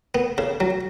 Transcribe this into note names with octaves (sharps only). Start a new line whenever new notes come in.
B3
C#3
F#3